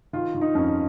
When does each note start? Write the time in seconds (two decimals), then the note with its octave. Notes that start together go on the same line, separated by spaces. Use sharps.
0.13 D#3 F4
0.35 D#3
0.41 D#4
0.55 F2 C#4